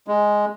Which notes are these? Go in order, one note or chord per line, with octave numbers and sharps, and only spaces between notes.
G#3